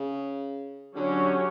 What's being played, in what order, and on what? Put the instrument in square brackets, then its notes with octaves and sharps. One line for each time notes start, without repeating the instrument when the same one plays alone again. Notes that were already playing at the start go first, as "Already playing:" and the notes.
Already playing: [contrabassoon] C#3
[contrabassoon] D3 [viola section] F#3 C#4 G4